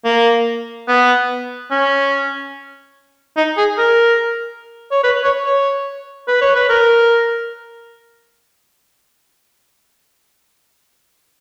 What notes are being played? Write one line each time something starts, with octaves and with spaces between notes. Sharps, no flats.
A#3
B3
C#4
D#4
G#4
A#4
C#5
B4
C#5
C#5
B4
C#5
B4
A#4